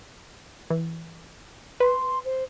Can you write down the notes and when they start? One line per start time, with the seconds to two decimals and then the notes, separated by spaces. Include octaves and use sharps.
0.70 E3
1.80 B4 C6
2.25 C5